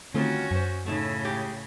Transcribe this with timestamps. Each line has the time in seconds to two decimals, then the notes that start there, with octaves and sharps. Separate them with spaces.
0.14 D3 D#3 G3 A3 C4 C#4 F4 F#4
0.51 F#2 C5 G#5
0.86 A2 C#3 A3 D#4 E4
1.25 G#3 G4 G#4